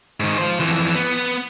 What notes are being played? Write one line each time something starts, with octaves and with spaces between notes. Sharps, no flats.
G#2 D#3
F4 C5
F2 E3
B3